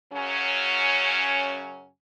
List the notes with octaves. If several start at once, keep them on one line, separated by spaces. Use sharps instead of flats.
F#2 C#3 F#3 C#4